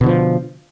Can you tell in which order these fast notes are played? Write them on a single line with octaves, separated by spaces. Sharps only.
B2 D3 F3